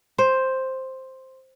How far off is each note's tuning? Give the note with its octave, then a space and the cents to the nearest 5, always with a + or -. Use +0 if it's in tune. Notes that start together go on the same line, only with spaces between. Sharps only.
C5 +5